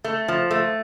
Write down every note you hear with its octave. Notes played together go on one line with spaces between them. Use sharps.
A3
F3
A3